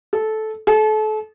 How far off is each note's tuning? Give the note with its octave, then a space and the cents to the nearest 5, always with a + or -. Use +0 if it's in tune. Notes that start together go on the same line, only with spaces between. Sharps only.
A4 -15
A4 -35